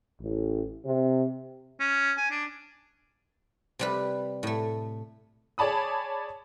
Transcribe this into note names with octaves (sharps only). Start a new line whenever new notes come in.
A1
C3
C#4
G#5
D4
C3 G3 B4
A2 A3
G#4 C#5 D5 A5 B5 D#6